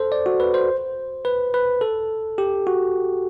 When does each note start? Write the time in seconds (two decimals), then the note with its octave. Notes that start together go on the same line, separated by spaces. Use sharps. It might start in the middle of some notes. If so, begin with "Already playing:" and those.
Already playing: A4 C5
0.12 D5
0.26 F#4
0.40 B4
0.54 C5
1.25 B4
1.54 B4
1.81 A4
2.38 G4
2.67 F#4